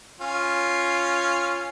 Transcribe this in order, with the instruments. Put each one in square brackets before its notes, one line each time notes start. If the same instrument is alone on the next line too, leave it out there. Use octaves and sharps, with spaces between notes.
[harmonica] C#4 F4 G#5